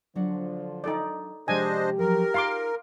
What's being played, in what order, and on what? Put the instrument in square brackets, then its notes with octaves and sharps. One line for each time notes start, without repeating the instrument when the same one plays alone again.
[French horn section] D3 F3 [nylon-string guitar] F#3 D4 F#5
[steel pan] D#4 A4 D5
[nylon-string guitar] C3 F3 G#3 [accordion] D4 C5 D#5 [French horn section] G4 [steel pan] G#5
[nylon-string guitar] F3 F#3 [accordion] A#4
[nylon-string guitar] D#4 F4 G#4 [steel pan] F5 C6 D6